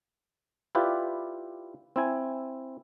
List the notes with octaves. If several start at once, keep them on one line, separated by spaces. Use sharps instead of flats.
E4 F4 G4 B4 D5
C4 E4 G#5